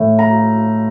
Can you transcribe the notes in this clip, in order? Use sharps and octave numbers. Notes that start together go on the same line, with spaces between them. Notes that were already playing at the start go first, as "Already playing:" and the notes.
Already playing: A2 E3
A#5